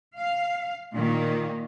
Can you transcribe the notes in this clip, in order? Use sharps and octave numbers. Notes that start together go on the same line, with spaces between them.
F5
A#2 D#3 A#3